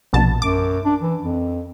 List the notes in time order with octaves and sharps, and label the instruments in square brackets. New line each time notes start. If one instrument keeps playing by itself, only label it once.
[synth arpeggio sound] A#1 B2 A5
[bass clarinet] F#2 [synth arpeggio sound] D6
[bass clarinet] D4
E3
F2